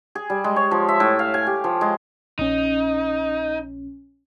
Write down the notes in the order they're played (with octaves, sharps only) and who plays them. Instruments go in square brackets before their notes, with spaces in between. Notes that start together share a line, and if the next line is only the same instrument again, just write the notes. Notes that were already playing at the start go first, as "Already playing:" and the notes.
[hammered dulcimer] G#4
G3
G#3
C#5
F3
E5
A2
F5
G#5
G4
F3
G#3
[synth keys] A#1 C#4 [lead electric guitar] D#4